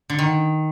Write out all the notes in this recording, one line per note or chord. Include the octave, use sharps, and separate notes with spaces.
D3
D#3